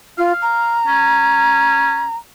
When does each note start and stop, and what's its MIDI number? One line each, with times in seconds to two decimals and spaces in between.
0.18 0.33 65
0.18 0.74 77
0.42 2.16 82
0.87 2.05 61